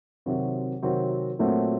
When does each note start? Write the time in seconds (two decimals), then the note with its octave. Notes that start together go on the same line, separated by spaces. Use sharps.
0.26 C3 D#3 F#3 C4 F#4
0.82 C3 D#3 F#3 C4 F#4
1.39 A#2 F#3 A3 C4 F#4